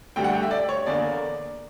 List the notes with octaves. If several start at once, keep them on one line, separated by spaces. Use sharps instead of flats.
D2 D3 G3 G5
F#5
G5
E5
D5
C#5
E2 D3 A#3 D5